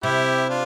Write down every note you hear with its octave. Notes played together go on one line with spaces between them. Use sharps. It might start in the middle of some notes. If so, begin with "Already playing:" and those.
C3 E4 G4
D4 F4